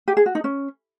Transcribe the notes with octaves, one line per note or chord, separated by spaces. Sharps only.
G4
G#4
F#4
D#4
C#4